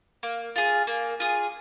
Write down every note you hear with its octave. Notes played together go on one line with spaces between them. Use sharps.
A#3
F4 G#4
A#3
F4 G#4